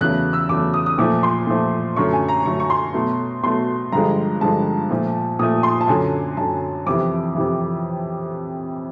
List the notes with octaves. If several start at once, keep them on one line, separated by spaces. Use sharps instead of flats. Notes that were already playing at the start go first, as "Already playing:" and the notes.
E2 C#3 F#3 A3 F#6
E6
E2 C#3 F#3 A3 D6
D#6
D#6
A#2 F3 A3 D6
C6
A#2 F3 A3
F#2 D3 F#3 A3 C#6
G#5
A#5
F#2 D3 F#3 A3 C#6
C#6
C6
B2 F#3 A3
B2 F#3 A3 C6
G2 D3 F3 G#3 A#5
G2 D3 F3 G#3 A5
A#2 F3 A3
A#2 F3 A3 D#6
C6
A5
F#2 D3 F#3 G#5
F#2 D3 F#3 A5
F2 C3 E3 D6
F2 C3 E3